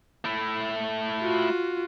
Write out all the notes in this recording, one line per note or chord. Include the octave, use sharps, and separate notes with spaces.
A3 E4
F4 F#4